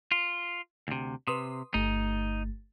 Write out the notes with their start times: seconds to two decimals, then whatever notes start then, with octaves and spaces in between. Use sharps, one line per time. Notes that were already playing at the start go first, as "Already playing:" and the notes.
0.11 F4
0.88 D2 C3
1.27 C3 B4 C6 D#6
1.74 G1 A3 D#4